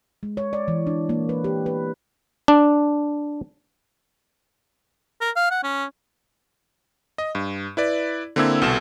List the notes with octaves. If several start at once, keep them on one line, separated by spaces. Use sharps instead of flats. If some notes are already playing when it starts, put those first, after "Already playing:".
G#3
C#5
D5
E3
D4
A#3
B4
G4
B4
D4
A#4
F5
F#5
C#4
D#5
G2
E4 B4 D5
D3 A#3 C4 E4 E6 G#6
C2 B2 A4 E7